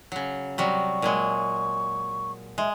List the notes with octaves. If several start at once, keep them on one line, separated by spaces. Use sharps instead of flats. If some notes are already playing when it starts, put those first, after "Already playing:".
C#3 F#3
C3 F#3 G3 C#6
A#2 F#3 G#3
G#3 E5